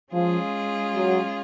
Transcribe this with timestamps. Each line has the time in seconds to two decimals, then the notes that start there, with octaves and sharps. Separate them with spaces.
0.13 F3 G#3 C#4 F4 G#4
0.95 F#3